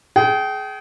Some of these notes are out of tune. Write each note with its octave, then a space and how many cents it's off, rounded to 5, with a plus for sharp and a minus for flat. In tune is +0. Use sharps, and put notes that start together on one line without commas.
G#4 +25 G5 -25